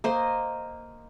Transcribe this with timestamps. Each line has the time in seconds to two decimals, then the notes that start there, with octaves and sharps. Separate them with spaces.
0.04 A#3 C5 D#5